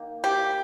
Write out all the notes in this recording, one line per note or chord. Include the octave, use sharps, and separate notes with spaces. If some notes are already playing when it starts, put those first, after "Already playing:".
Already playing: D#3 A#3
G4